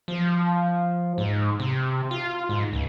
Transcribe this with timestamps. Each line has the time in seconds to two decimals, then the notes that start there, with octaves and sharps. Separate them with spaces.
0.08 F3
1.18 G#2
1.60 C3
2.11 F4
2.49 G#2
2.73 C#2